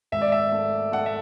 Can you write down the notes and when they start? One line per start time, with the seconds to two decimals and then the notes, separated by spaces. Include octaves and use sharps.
0.12 G#1 E5
0.21 D5
0.32 E5
0.52 A3
0.92 A3 F#5
1.06 E5